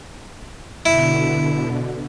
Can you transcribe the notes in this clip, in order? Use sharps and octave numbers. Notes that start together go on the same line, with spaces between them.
B2 D3 E4